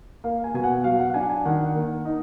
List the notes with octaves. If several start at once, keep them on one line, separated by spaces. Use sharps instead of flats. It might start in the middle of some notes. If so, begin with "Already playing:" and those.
A#3 F5
G#5
B2 G#5
F#5
F#3 F5
F#5
F#5
D4 G#5
G#5
D#3 F#5
A#3
D#4